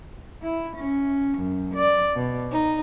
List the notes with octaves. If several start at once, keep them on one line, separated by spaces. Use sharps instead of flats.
E4
C#4
F#2
D5
B2
D#4